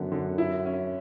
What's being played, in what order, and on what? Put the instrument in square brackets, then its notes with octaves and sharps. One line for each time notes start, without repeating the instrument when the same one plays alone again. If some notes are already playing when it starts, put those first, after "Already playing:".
Already playing: [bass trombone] F#2 [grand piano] D3 B3
[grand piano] D3
E4
C#4